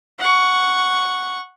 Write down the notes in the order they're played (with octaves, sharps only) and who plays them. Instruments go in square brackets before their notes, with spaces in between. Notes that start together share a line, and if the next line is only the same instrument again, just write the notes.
[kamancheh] F#5 C#6